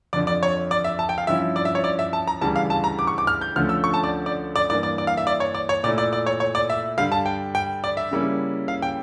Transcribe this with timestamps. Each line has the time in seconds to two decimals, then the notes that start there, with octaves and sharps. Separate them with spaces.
0.13 F2 D3 F3 D5
0.27 D5
0.43 C#5
0.71 D5
0.84 E5
0.99 A5
1.09 G5
1.18 F5
1.27 G2 F3 C#4 E4 E5
1.56 D5
1.65 E5
1.75 C#5
1.84 D5
1.99 E5
2.13 A5
2.27 A#5
2.41 D2 C#3 E3 G3 A5
2.56 F5
2.70 A5
2.84 A#5
2.99 D6
3.07 C#6
3.18 D6
3.27 F6
3.41 G6
3.56 D2 D3 F3 A3 C#4 F6
3.69 E6
3.84 C#6
3.94 A5
4.04 D5
4.26 D5
4.56 D5
4.70 G2 E3 A#3 D5
4.83 D5
4.98 D5
5.07 F5
5.17 E5
5.27 D5
5.40 C#5
5.55 D5
5.69 C#5
5.83 A#2 A3 E4 D5
5.98 D5
6.13 D5
6.26 C#5
6.40 C#5
6.55 D5
6.70 E5
6.98 G2 D3 G3 F5
7.12 A5
7.26 G5
7.55 G5
7.84 D5
7.97 E5
8.11 C#3 G3 A#3 C#4 E4
8.68 F5
8.82 G5